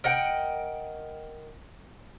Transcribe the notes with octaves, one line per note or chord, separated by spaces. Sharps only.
A#4 D#5 F#5 G5